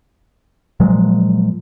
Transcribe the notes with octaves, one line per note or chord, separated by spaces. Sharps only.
A#2 F3 F#3 G#3